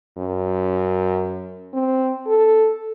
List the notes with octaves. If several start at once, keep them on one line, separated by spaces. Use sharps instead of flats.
F#2
C4
A4